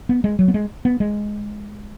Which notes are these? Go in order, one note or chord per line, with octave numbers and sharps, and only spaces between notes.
B3
G#3
F#3
B3
G#3
B3
G#3